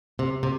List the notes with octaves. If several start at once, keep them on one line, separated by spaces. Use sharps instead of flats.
C3
C3